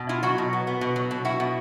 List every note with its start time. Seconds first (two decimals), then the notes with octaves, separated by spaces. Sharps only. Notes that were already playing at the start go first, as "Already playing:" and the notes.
Already playing: B2
0.09 E4 F4
0.23 F#3 F#4
0.38 B2
0.53 B3
0.67 B3
0.81 B2
0.96 F#3
1.11 B2
1.25 E4 F#4
1.40 B2